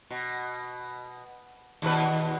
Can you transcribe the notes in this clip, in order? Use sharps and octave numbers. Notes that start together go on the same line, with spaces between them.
B2
D#2 B2 B4